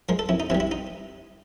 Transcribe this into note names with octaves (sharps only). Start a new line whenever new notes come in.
F3 G#3 A#4
A4
F2 E4
D#4
C3 E3 G3 E4
E4
D#4